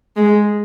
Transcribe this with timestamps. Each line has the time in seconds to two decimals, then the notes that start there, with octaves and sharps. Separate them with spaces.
0.16 G#3